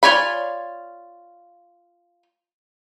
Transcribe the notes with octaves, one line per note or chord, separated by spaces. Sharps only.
F4 C#5 D5 G#5 B5